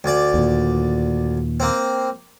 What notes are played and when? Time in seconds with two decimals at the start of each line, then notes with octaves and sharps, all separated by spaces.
0.04 D2 D5
0.34 D#2 A#2
1.60 A#3 C4